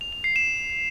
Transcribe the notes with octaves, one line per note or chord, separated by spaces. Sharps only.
F7
F7
C7
E7